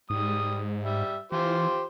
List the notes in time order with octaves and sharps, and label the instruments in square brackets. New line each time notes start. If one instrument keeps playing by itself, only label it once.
[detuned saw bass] G#2 [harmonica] G3 D#6
[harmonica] G3 E5
[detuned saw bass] E3 [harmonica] F4 G4 C5